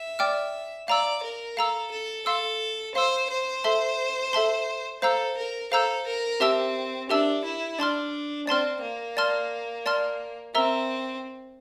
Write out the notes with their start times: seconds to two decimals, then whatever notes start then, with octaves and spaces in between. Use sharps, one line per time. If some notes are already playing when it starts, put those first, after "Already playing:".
Already playing: E5
0.19 D5 G5 D6 F6
0.88 D5 F5 A#5 E6
1.23 A#4
1.57 A4 F5 A#5 E6
1.92 A4
2.26 A4 F5 C6 E6
2.95 C5 F5 C6 E6
3.30 C5
3.64 A4 E5 A5 C6
4.33 A4 E5 A5 C6
5.02 A4 C5 F5 A#5 E6 G6
5.37 A#4
5.72 A4 C5 F5 A#5 E6 G6
6.07 A#4
6.40 C4 G4 A#4 E5 A5 E6
7.09 D4 G4 A#4 E5 A5 E6
7.45 E4
7.78 D4 D5 A5 C6 F6
8.47 C4 D5 A5 C6 F6
8.82 A#3
9.17 D5 A5 C6 F6
9.86 D5 A5 C6 F6
10.55 C4 A#4 E5 A#5 E6